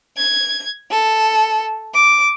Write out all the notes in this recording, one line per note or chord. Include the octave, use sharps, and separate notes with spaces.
G#6
A4
D6